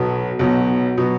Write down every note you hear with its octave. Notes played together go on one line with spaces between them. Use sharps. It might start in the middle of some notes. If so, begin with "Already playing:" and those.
Already playing: B1 B2 F#3 B3
B1 B2 F#3 B3
B2 F#3 B3